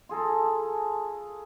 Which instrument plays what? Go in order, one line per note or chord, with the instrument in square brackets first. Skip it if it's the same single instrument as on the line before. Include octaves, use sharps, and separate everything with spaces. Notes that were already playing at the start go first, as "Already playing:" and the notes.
[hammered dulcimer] F4 G#4 A4 A#5